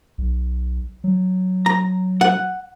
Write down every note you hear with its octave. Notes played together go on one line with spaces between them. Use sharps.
B1
F#3
A#5
F#5